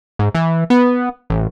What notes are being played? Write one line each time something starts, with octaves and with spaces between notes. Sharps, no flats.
G#2
E3
B3
A1